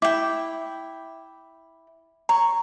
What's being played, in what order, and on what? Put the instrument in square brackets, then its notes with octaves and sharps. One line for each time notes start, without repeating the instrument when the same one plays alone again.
[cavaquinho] E4 G5 [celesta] D6
[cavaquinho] C#5 [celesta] A#5